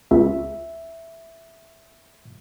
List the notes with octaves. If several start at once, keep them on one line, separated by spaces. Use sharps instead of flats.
C#2 E5